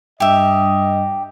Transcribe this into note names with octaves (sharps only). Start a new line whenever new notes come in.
G2 G4 D#5 E5